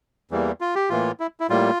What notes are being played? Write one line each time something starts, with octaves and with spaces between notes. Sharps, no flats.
E2 E3 G3 A#3
F4
G4
A2 E3 A#3 F4
E4
E4
A2 G3 A#3 F4